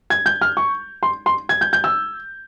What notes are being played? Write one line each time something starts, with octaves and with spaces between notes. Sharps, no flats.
G#6
G6
F6
C#6
C6
C6
G#6
G6
G6
E6